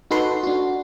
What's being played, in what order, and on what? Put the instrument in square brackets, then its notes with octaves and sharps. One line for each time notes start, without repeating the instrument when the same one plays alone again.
[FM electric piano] D#4 F#4 A4 B4 C6
D4 F#4